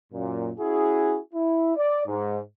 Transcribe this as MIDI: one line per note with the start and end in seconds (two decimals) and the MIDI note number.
0.13 0.51 42
0.13 0.51 46
0.58 1.18 61
0.58 1.18 64
0.58 1.18 66
0.58 1.18 68
1.34 1.74 64
1.76 2.02 74
2.06 2.39 44